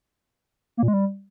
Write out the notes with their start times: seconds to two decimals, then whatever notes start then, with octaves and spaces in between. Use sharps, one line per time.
0.77 A#3
0.83 A#2
0.88 G#3
0.93 G3